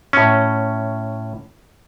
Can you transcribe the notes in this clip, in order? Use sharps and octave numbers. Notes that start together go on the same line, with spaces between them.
A2 C#4